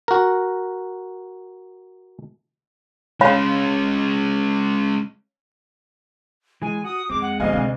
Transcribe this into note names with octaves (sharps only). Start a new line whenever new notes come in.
F#4 A#4
G#3 C#4 C#5 F5 B5
E3 G#3 G#5
F#4 D#6
F2 G#3 C4 D6
F#5
D2 F3 D#5 F5 G#5
C3